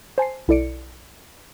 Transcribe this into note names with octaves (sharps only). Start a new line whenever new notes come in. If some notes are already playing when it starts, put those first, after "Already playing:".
C5 G#5 A5 C7
B1 E4 A4 D5 C#7 D7